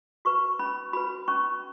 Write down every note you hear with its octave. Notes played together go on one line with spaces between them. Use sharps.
F#4 B4 C#6
C#4 B5
F#4 B4 B5
C#4 C#6